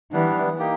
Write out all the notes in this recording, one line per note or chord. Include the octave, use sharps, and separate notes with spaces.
E3 G3 B3 D4
A#3 D#4 G4